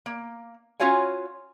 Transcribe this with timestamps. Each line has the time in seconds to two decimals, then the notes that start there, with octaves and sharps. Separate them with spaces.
0.06 A#3
0.80 C#4 F4 F#4 C#5 F5 G#5